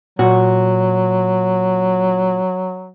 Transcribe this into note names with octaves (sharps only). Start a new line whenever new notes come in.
A#2 F#3 F#4